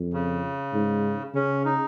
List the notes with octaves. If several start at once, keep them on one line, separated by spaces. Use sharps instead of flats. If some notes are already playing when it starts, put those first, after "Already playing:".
Already playing: F2
C#3
G#2
C#3 C#4
D#4